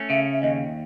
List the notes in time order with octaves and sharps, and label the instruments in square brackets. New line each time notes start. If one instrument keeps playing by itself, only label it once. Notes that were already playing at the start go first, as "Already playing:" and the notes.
Already playing: [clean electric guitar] A3 C#4
[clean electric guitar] C#3 [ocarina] E5
[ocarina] E5
[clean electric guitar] D#2 [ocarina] D#5